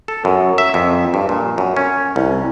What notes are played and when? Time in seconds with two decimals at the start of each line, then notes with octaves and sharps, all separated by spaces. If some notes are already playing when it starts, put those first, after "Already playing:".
0.08 A4
0.25 F#2
0.58 E5
0.74 F2
1.14 G2
1.29 A#2
1.58 F#2
1.77 C#4
2.16 C2